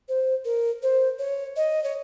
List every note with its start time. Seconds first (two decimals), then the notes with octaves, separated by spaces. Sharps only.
0.08 C5
0.45 A#4
0.82 C5
1.19 C#5
1.56 D#5
1.84 C#5